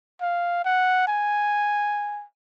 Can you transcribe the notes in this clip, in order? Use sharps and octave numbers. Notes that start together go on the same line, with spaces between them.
F5
F#5
G#5